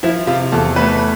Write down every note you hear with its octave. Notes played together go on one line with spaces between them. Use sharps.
F3 E4
C3 F4
E2 A4
A3 B4